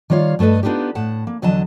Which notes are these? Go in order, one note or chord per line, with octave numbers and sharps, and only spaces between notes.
D#3 G3 F4 C#5 F5
G2 A3 A4 B4 D#5
B3 D4 D#4 F4 G4
A2 F#5 A5
A#3
E2 D3 F#3 D#5 A5